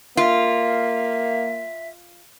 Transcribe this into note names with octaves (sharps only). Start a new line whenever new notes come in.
A#3 F4 E5